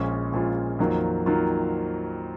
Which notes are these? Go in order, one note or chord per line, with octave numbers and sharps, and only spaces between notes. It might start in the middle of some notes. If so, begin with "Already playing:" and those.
Already playing: A#1 A#2 G#3 C#4 F4
A#1 A#2 G#3 C#4 F4
F2 D#3 F#3 A#3 F4
D#3 F#3 A#3 F4